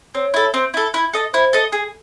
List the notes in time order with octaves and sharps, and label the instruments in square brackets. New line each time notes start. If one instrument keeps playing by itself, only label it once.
[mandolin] C4 [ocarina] C#5
[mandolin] E4 A4
C4
E4 A4
E4
A4 D#5
[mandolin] E4 [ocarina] C5
[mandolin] A4 D#5
G#4